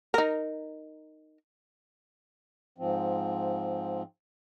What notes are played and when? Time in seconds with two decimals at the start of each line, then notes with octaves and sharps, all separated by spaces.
0.14 D#4 A#4
2.78 G#2 F3 C4